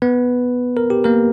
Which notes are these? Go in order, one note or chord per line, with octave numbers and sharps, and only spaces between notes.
B3 B4
A#4
G4
A#3 A#4